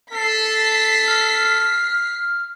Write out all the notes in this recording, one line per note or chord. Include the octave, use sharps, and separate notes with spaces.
A4 B6 C7
F6